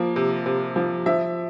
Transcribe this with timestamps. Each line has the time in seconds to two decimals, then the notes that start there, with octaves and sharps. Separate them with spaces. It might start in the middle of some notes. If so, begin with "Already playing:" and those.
Already playing: F3 A#3
0.16 C3
0.46 C3
0.76 F3
1.06 F3 E5